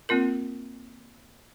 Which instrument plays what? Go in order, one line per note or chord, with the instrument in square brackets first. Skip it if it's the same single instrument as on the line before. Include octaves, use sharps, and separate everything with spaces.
[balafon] A#3 C4 F4 A#4